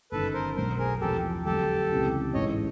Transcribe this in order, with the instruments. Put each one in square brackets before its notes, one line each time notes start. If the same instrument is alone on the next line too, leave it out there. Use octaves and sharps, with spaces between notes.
[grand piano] G1 F#2 D#3 [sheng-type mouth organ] A4 B4
[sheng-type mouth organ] A#4 C5
[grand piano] B1 B2 F#3 A3 D4 [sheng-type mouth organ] A#4 C5
[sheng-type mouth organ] G#4 A#4
[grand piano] E2 C3 F3 [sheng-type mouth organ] G4 A4
[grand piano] F2 D3 F#3 A3 [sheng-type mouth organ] G4 A4
[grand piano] C#2 C3 E3
[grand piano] A1 G#2 E3 [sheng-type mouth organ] C#5 D#5